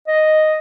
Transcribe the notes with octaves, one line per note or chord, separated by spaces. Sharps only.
D#5